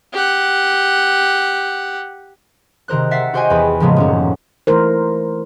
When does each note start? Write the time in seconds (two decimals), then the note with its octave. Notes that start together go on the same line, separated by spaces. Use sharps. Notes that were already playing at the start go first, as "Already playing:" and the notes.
0.13 G4 F#5
2.88 C3 D#3 A#4 C5 F#6
3.11 E5 F#5 A6 B6 C7
3.34 F#4 G4 C5 D#5 G5 G#5
3.50 E2 B4 B5
3.80 A2 C#3 F3 G#3 A#3 B3
3.96 D#1 F#2 C#4
4.67 E3 A3 D#4 E4 A#4 C5